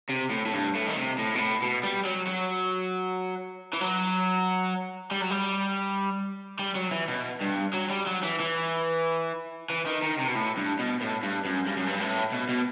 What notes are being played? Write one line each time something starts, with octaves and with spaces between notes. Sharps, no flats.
C3
A2
A2
G2
A2
D#3
C3
A2
B2
A2
B2
G3
F#3
F#3
E3
F#3
G3
F#3
G3
G3
F#3
E3
B2
G2
F#3
G3
F#3
E3
E3
E3
D#3
D#3
C3
B2
A2
G2
B2
A2
G2
F#2
G2
F#2
G2
A2
B2
B2